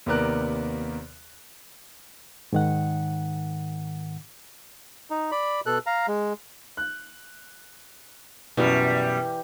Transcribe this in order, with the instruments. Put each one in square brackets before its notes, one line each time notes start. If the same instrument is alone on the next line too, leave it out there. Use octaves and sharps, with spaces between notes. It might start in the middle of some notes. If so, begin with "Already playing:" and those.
[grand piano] D#2 C3 B3 A#4 D5 F#6
[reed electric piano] G#2 D#3 F#5
[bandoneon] D#4
D5 B5
B2 A4 F#6
F5 A#5
G#3
[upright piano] F#6
[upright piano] F#2 B2 [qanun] E3 [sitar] G3